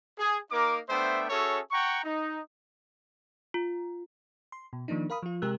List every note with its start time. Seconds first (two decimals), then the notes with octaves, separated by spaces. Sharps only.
0.18 G#4
0.51 A#3 D#4 A#4 D6
0.89 A3 B3 D4 C5 E5 G5
1.29 C#4 F#4 G#4 A4 C#5 E5
1.71 F#5 G5 A#5 C#6
2.04 D#4
3.54 F4
4.52 C6
4.73 B2
4.88 D#3 F3 A#3 D4 D#4
5.10 A#4 F5 B5 D#6
5.23 F3 F4
5.42 C3 G#3 G4 A#4 E6 F#6